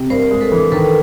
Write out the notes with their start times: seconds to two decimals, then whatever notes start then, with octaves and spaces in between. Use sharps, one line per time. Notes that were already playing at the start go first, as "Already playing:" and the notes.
Already playing: C3
0.10 G2 A#4 C5
0.31 G#3
0.41 A4 B4
0.52 E3
0.72 D#3 A4 B4